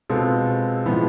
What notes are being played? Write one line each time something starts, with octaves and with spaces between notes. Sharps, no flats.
B2 G#3 C4 F4 A4
A2 F3 G#3 B3